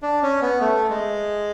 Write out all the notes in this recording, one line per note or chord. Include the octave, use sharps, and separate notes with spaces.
D4
C#4
B3
A3
G#3